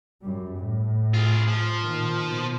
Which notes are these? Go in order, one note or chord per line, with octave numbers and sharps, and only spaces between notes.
F#2 G3
A2
F4 G#4
F3
A#2 D#3
B2